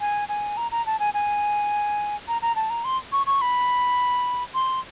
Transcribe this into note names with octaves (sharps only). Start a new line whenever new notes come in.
G#5
G#5
A#5
A#5
A5
G#5
G#5
A#5
A#5
A5
A#5
C6
C#6
C#6
B5
C6